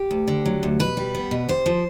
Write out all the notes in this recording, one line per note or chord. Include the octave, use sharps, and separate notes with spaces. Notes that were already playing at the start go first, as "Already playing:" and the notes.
Already playing: G4
D2
D3
F#3
D2
B2 B4
G3
B3
B2
C3 C5
F3